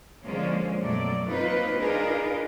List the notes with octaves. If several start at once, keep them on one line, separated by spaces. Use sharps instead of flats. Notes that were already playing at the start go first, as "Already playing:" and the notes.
D3 F3 G#3 A#3 C#4 F4
F#2 B2 F#3 A3 D5
F#3 A#3 C4 D#4 F4 B4
D4 D#4 F4 G#4 A#4 B4